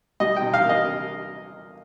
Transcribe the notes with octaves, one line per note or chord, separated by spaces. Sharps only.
G3 D#5
C3 G5
F5
A#3
D#5